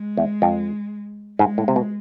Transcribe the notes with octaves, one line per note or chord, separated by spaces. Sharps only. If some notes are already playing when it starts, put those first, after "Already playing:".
Already playing: G#3
E2
F2
G#2 G#3
A2
C3
B2